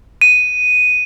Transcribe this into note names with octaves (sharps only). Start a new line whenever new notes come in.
D#7